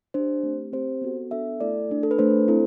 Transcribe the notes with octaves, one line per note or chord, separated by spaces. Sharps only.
D4 G4 C5
A3 C4 G4
C4 G4 C5
B3 F#4 A4
B3 D4 A4 E5
A3 E4 A4 D5
A3 D4 A4
A4
B4
A3 D4 A4 C5
C4 E4 A4